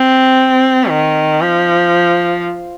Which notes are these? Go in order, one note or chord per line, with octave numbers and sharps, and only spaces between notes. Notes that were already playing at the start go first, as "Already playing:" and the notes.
Already playing: C4
D#3
F3